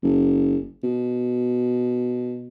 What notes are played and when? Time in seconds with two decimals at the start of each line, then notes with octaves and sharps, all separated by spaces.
0.03 F#1
0.84 B2